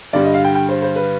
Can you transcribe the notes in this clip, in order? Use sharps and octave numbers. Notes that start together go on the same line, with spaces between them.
G2 D3 G3 D5
D#5
F5
G5
G5
C5
C5
B4